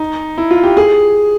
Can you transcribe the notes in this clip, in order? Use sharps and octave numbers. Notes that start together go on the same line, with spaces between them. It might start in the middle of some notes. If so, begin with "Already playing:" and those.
Already playing: D#4
E4
F4
G4
G#4